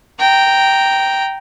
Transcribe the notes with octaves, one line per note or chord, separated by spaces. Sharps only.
G5 A#5